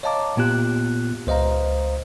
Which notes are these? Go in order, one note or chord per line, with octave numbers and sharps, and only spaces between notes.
C#5 D#5 F5 A5 A#5 D6
A#2 B3 F4 G4 F#6
C#2 C5 D#5 F5 A#5